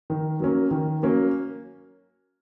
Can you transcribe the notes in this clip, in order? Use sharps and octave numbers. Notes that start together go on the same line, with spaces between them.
D#3
F#3 A#3 C#4
D#3
F#3 A#3 C#4